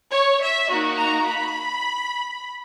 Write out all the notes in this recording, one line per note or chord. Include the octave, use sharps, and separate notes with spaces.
C#5
E5
A#3 D#4 F#4
A#5
B5